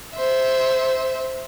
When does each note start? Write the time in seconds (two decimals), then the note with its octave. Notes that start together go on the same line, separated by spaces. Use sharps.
0.16 C5 E5